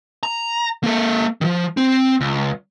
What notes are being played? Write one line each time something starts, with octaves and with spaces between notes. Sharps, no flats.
A#5
A#3 A4
D#3 F3
C4
C#2